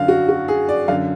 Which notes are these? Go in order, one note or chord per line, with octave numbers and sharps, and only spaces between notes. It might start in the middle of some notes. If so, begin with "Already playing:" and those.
Already playing: F#2 D3 F5
F#4
F#4
G#4
D5
F#2 D3 F5